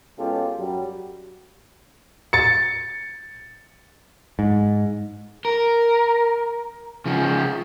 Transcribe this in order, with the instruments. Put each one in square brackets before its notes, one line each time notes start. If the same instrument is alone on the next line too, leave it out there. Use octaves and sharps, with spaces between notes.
[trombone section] B2 G#3 C#4 F4 G4 A4
F#2 F#3 G3
[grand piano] A6 C#7
[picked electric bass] G#2
[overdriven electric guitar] A#4
C#3 F3